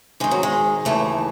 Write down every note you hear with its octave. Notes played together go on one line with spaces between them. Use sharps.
G#2 D#3 G#3
F#3
G#3
D#2 C#3 E3 A3